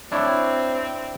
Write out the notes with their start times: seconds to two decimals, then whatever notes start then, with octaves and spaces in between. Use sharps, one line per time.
0.12 C4 D4 E4 C#5